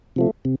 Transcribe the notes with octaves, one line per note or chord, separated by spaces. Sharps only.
C3 F3 A3
C3